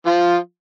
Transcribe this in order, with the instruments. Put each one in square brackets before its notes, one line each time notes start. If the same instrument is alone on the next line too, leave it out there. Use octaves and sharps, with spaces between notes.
[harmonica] F3 F4